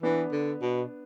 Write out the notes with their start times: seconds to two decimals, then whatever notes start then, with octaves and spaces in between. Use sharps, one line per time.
0.03 E3 B3 D4
0.32 D3
0.62 B2